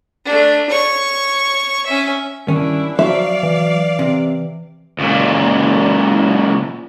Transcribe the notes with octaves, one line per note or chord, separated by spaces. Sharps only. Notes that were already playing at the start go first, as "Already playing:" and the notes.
A3 D4
C#5 C#6
C#4 E5
G2 D#3 C#4 D4 E4
F3 F#3 D5 E5 F5
E3
C3
C#2 A#2